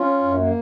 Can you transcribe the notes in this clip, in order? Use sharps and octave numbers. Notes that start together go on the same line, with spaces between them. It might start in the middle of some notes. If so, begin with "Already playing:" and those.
Already playing: C#4 F4
F#2
A#3